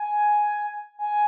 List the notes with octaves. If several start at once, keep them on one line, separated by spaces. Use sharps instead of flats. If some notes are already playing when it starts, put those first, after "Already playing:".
Already playing: G#5
G#5